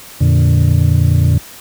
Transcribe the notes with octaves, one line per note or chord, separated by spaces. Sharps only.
F2 A#2 D3